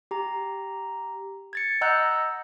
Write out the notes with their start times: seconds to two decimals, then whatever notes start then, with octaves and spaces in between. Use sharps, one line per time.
0.11 G4 A#5
1.53 G#6 A6 C#7
1.81 D#5 F#5 A#5 E6 F#6 G6